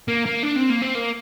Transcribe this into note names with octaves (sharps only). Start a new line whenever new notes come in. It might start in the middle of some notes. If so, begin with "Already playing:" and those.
A#3
A#3
D4
C4
A#3
C4
A#3